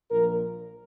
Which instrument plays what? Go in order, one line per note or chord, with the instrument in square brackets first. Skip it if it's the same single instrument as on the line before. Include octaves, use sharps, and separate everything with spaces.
[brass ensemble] A#1 A#2 F3 A#4